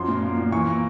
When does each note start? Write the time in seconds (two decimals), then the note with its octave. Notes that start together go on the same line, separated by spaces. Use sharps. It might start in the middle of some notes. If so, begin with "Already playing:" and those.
Already playing: F#2 F3 C6
0.08 A#2
0.23 A#3
0.37 A#2
0.52 E3 C#6
0.67 A#3